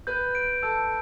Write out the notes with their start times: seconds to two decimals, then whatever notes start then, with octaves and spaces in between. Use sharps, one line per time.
0.07 B4 G6
0.35 D7
0.63 A4 E6